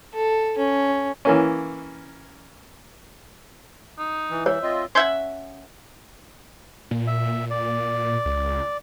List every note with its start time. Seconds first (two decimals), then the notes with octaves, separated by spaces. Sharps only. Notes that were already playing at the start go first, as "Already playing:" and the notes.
0.14 A4
0.58 C#4
1.25 E3 A#3 C#4
3.98 D#4
4.30 E3
4.46 C#5 E5
4.63 C4 F4 D#5
4.95 C#4 E5 F#5 C6 G6 G#6
6.91 A#2
7.07 E5
7.50 D5
8.26 C#2